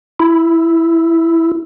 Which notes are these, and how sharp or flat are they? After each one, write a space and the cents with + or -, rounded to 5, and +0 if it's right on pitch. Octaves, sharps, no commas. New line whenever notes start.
E4 +5